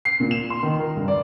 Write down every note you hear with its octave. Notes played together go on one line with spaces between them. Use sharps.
C7
A#2
E7
C6
D#3
A#4
G2
D5